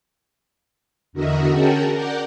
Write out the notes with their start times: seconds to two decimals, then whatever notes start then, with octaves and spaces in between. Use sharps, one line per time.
1.13 E2 D3 F#4 A#4 D#5 E5
1.50 C#4 F#4 G#4 A#4 G5 A5
1.91 A#4 D5 F#5 G6